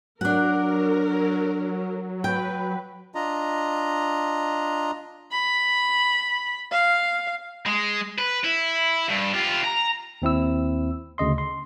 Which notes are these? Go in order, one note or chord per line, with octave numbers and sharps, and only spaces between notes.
F#3 D4 A#4 F#5
B4 G5
D4 F4 D#5 A#5
B5
F5
G#3
B4
E4
G2
F4 G4
A#5
D#2 C4 E4 E6
D2 C#3 D#5 C6
C6